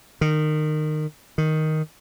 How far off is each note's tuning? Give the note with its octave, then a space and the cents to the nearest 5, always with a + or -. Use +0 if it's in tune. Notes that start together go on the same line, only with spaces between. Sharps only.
D#3 -25
D#3 +5